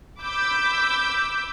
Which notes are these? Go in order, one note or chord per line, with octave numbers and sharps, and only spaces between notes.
B5 D6 E6 G6